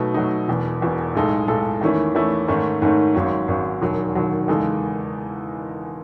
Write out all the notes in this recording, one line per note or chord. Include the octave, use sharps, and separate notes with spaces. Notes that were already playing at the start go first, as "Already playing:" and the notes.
Already playing: B2 F#3 A3 D#4
B2 F#3 A3 D#4
E1 E2 B2
E1 E2 B2
B1 A2 G#3 D#4 A4
B1 A2 G#3 D#4 A4
E2 D#3 A3 C#4 E4
E2 D#3 A3 C#4 E4
G#2 D#3 A3 C#4
G#2 D#3 A3 C#4
G#1 G#2 F#3 C#4
G#1 G#2 F#3 C#4
E1 D#2 D#3 F#3
E1 D#2 D#3 F#3
E2 C#3 G#3 D#4 A4